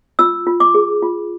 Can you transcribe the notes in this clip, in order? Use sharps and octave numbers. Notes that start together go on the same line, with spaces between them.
F4 E6
F4
D6
G#4
F4